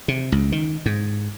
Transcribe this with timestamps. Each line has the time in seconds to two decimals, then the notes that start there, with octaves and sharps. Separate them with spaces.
0.08 C3
0.32 C#2
0.52 D#3
0.86 G#2